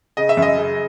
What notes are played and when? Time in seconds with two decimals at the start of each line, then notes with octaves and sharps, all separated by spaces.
0.17 C#3 D#5
0.29 E5
0.37 F#2
0.42 D#5
0.58 C#3